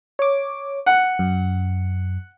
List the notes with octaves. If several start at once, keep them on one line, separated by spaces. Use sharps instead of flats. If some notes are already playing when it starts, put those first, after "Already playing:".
C#5 D6
F#5
F#2